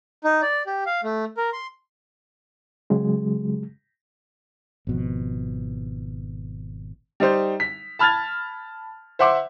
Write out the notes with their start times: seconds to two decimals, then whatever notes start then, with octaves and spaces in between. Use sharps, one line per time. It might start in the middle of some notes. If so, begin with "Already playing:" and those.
0.24 D#4
0.42 D5
0.66 G4
0.86 F5
1.04 A3
1.37 A#4
1.53 C6
2.90 C#3 F#3 G#3
4.87 G#1 B2 F3
7.20 G3 D#4 C5
7.60 B6
7.99 A5 B5 F6 G#6 A6 F7
9.19 C5 E5 F#5 C6 D6